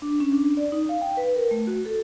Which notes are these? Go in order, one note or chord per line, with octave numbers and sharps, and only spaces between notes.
D4
C#4
D4
D5
D#4
F5
G5
B4
A#4
A3
F#4
A4